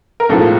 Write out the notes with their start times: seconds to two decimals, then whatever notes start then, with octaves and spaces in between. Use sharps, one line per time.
0.20 A#4
0.29 B1 A2 F3 G#3 A4